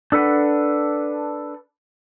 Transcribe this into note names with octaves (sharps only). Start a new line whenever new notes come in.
D4 A4 B4 F#5